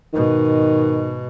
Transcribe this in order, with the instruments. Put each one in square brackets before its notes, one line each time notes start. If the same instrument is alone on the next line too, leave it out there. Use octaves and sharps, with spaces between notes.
[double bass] G#2 B2 [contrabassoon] D#3